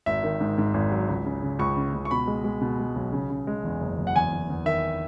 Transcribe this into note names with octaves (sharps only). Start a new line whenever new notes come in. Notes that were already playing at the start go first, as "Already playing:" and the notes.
G#1 E5
D#3
G#2
G#2
G#1
F#3
C#2
C#3
C#3
C#2 C#6
C#3
C#2
C#6
B2 B5
G#3
G#3
B2
G#3
B1
C#3
C#3
G#3
E2
F#1
F#1
F#5
E2 G#5
E2
E2
D#3 E5